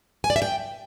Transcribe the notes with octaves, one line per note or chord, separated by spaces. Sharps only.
G#5
D5
E5
G5